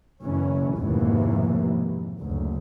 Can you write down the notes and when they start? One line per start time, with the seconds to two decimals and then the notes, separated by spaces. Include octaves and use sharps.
0.22 F#1 B2 E3 C#4
0.76 F1 D#2 G#2 B2 E3 A#3
2.19 F#1 D2